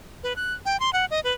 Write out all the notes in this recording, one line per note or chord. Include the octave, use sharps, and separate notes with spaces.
B4
F#6
G5
C6
F#5
D#5
B4